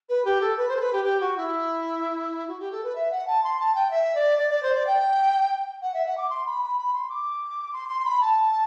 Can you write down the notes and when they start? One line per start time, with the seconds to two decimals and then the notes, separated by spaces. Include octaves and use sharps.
0.09 B4
0.25 G4
0.41 A4
0.57 B4
0.69 C5
0.77 A4
0.80 B4
0.93 G4
1.04 G4
1.20 F#4
1.37 E4
2.48 F#4
2.59 G4
2.72 A4
2.84 B4
2.95 E5
3.11 F#5
3.27 A5
3.44 C6
3.59 A5
3.75 G5
3.91 E5
4.15 D5
4.39 D5
4.50 D5
4.63 C5
4.75 D5
4.87 G5
5.82 F#5
5.94 E5
6.06 F#5
6.18 D6
6.30 C6
6.46 B5
6.62 B5
6.78 B5
6.94 C6
7.09 D6
7.73 C6
7.89 C6
8.05 B5
8.21 A5